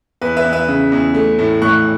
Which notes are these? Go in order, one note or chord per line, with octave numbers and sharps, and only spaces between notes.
E2 B4
B4 E5
E2
B4 E5
C#3
E2
A3
A2
A2 C#6 F#6